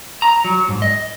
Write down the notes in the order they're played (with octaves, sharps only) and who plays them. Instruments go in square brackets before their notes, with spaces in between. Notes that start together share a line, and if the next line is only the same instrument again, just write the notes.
[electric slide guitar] A#5
F#3
G#2
D#5